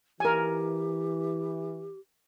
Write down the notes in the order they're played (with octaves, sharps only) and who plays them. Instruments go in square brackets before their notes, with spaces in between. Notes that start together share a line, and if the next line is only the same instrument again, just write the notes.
[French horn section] E3 [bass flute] G4 [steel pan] A#4 G#5